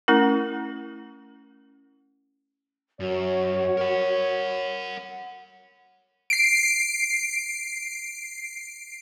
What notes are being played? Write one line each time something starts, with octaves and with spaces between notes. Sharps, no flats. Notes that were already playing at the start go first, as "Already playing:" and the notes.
A3 C#4 E4 A#4
F#2 F#4 C#5
A#4 F#5
C7 D7